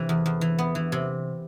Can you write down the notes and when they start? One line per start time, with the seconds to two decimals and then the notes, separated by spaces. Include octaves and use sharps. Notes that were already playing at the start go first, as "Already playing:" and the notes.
Already playing: C3 E3
0.09 E2
0.26 E2
0.41 E3
0.59 B3
0.75 E3
0.92 C3